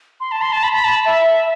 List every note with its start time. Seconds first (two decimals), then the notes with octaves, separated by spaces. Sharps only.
0.20 C6
0.32 A5
0.42 C6
0.52 A5
0.63 B5
0.73 B5
0.84 A5
1.06 E5